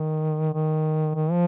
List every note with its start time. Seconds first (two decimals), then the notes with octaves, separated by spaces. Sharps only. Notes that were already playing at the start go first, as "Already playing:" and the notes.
Already playing: D#3
0.54 D#3
1.15 D#3
1.31 F3